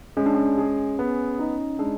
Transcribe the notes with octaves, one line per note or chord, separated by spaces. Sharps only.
G#3 C#4
D4
C#4
G#4
B3
D#4
G#3 D4